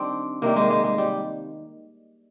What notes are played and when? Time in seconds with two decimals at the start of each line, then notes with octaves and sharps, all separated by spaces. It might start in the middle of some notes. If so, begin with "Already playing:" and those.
Already playing: D#3 G3 C4 D4
0.42 C3 D#3 G3 A#3
0.56 G#3
0.70 G#3
0.84 G#3
0.98 G3